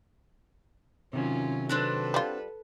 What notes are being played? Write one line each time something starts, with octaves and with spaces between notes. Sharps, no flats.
C3 D#3 F#3 C#4 F4
C4 D4 F#4 A4 B4
G3 F4